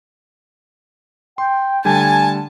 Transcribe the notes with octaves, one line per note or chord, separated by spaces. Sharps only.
G5 C6
D3 G3 A3 G#5 A5